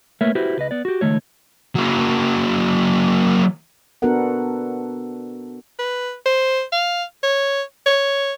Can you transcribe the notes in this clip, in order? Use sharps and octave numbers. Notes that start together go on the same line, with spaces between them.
A3 A#3 A#4 B4 C#5 E5
E4 F#4 G4 B4 C5
C#2 B4 D#5
B3 D5
F#4 G4
C#2 A#2 D#3 A3 C#5
F#3 A#3
B3 D4 F#4 A4 A#4 F#5
B4
C5
F5
C#5
C#5